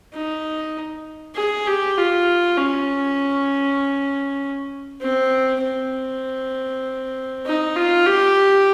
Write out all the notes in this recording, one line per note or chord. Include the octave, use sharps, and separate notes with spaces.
D#4
G#4
G4
F4
C#4
C4
C4
D#4
F4
G4